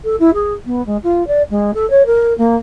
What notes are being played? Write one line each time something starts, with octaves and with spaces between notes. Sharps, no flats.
A4
E4
G#4
B3
G#3
F4
D5
G#3
A4
C#5
A#4
A#3